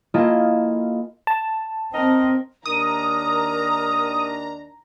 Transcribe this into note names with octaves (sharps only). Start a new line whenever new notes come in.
A#3 E4 F4 A4 D#5 G#5
A5
C4 D#4 A#4 D#5
D#2 D#3 D4 A#4 A#5 D#6